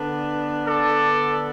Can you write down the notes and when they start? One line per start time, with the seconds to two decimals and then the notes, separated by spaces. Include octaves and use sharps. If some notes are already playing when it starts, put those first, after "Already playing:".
Already playing: D3 B3 D4
0.67 A4 D5